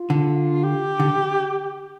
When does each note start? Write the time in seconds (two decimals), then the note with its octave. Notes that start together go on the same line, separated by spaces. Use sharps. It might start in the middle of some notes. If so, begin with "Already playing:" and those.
Already playing: F4
0.10 D3
0.64 G4
1.00 D3